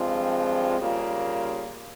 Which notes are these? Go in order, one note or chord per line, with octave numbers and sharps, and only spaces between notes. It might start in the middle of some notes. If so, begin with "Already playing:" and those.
Already playing: G2 F3 G#3 C4 F4
C#3 G3 A#3 F4